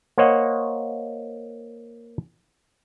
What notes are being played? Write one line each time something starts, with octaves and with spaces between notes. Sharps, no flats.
A#3 C5 C#5 D#5 F#5